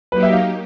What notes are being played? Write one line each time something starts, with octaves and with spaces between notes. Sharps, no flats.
F#3 A#3 D#4 G4 B4
E5
F5